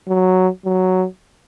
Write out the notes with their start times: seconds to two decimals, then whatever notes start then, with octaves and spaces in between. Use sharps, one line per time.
0.08 F#3
0.65 F#3